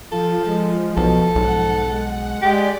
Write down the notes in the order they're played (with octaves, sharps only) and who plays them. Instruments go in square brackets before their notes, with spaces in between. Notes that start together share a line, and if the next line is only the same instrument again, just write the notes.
[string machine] F3 [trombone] F4 [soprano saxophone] A4
[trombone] G#3
[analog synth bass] B1 [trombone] B2 [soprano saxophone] A4
[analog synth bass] B1 [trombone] G#2 [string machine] F#5
[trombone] G#3
[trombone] G#3 [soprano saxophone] G4 [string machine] D5